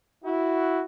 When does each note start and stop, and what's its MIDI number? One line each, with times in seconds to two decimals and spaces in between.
0.24 0.81 64
0.24 0.81 66